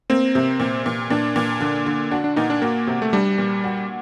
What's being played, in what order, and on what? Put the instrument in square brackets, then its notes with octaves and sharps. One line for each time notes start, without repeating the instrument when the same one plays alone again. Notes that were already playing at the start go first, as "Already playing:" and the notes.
[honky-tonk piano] A#3 [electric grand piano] C4
[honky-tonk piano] C3
A#2
A#2
[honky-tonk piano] A#2 [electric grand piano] D4
[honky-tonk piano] A#2
D3
D3
[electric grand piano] D4 [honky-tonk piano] F#4
[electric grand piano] D4
[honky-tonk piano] A#2 [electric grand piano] D#4
[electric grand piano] D4
[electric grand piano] A#3 [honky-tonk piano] F#4
[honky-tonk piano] C3
[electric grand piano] A3
[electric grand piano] G3 [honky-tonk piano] D4
[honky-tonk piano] A#2
F#4